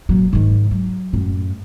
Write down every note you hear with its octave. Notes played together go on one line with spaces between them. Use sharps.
A#2 F#3
G#2 D#3
F#3
F#2 A2